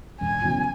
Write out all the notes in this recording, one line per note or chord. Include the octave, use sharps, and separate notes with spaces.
E1 G#5
E2 C#3 F#3 B3